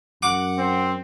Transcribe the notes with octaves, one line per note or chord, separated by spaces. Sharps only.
F#2 F#5 D6
C4